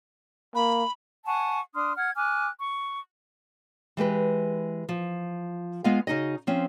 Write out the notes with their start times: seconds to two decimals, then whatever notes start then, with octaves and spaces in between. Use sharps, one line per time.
0.55 A#3 B5
1.26 F#5 G#5 A5 C#6
1.74 D4 C6 D#6 F6
1.95 F#5 F6 G#6
2.15 G#5 D6 F6 F#6
2.61 C#6
3.97 E3 G#3 G4 B4
4.89 F3
5.84 G#3 B3 F4 D#5 F5
6.07 C#3 D#4 F#4 D#5
6.47 F3 C4 C#4